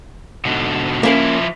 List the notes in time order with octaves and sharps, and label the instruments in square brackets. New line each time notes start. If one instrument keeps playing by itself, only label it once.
[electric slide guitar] G#2 B2 D3
[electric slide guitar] F3 E4 [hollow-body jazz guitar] A#3 C#4 A#4